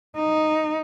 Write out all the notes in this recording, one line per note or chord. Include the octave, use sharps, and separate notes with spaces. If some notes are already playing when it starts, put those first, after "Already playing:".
D#4